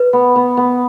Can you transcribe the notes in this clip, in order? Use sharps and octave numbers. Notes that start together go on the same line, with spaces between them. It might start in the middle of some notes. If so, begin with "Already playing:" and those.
Already playing: B4
B3
B3
B3